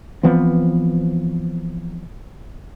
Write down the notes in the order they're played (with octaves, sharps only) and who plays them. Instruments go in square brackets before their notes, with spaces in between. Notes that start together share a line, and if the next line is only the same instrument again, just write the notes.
[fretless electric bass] E3 F3 B3 C4